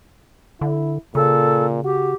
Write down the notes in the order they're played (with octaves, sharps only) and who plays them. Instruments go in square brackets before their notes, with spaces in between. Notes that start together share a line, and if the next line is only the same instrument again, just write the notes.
[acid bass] D3 [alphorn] E4
[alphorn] A#2 [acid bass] C#3 [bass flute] A4
[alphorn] F#4 [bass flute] G4